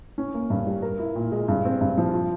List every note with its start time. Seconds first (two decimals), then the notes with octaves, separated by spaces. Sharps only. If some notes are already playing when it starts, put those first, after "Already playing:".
0.18 C#4
0.34 A#3
0.50 G2
0.66 G3
0.82 A#4
0.99 E4
1.15 A#2
1.32 G#3
1.48 G2
1.65 C4
1.81 G2
1.98 F3
2.14 F4